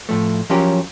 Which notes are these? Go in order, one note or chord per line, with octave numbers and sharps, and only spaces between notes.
A2 F3 A3
F3 F#3 C#4 G4 A#4